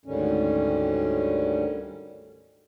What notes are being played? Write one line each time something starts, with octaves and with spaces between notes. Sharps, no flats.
D2 G#2 D3 D#3 G3 C#4